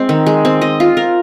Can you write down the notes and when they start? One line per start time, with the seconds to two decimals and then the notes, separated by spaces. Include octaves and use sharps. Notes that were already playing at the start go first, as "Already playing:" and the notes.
Already playing: G#3 C4
0.09 D#3
0.26 G#3
0.45 C4
0.61 D#5
0.80 F4
0.97 A#4